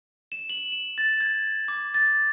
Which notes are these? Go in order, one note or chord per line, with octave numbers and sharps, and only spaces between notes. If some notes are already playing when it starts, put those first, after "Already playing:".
E7
F#7
E7
A6
G#6
D6
A6